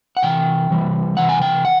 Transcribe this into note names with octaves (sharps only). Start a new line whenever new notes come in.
F#5
C3 E3 G5
C3 E3 G3
C3 E3 F#5
G#5
G5
F#5